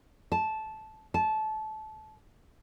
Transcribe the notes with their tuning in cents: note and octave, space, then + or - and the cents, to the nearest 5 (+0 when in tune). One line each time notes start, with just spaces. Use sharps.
A5 -10
A5 -20